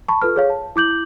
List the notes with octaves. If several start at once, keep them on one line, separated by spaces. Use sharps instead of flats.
A5 B5 C#6
F4 A4 B4 F6
G#4 C#5 F5
A5
E4 D6 G6 F#7